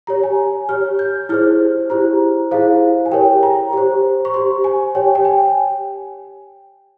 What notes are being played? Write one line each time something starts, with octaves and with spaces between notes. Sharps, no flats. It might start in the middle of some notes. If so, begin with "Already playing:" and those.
G4 C#5 A#5
G#5
G4 C#5 F6
G6
E4 G#4 C5 F6
E4 G4 C5 A#5
E4 G#4 C5 F5
G#5
G4 A#4 C#5 G5
A#5
G4 C5
C#6
G4 C5 C6
G#5
G4 C#5 G5
G#5
G5